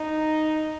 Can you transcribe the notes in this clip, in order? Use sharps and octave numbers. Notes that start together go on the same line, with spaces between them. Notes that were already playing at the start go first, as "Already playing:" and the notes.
Already playing: D#4